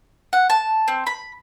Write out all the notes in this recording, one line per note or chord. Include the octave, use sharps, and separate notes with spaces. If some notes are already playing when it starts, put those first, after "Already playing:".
F#5
A5
C4
B5